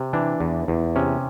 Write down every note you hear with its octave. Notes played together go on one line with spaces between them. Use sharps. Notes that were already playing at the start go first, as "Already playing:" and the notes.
Already playing: C3
E3 D4
E2
E2
C3 C#4